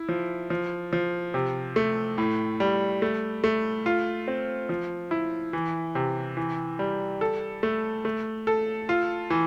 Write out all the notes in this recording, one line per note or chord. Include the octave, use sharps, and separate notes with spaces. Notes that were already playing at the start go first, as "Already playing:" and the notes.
Already playing: E4
F3
F3
F3
C3
A3
A2
G3
A3
A3
F4
C4
F3
E4
E3
C3
E3
G3
A4
A3
A3
A4
F4
E3